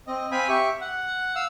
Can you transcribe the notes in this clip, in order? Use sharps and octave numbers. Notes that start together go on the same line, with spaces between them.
C4 D#5
C4 F5 G5 G#5 B5
G4 E5 C#6
F#5
F5 E6